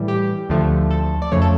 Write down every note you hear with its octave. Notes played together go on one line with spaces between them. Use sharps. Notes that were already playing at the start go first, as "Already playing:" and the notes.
Already playing: A2 E3 G3
G4
D2 D3 F3 A3
A4
D5
F2 C#3 F3 A3 C#5
A4